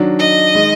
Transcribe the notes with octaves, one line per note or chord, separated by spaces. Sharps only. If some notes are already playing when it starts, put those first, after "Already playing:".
Already playing: D#3 F#3 D4
D#5
D#3 G#3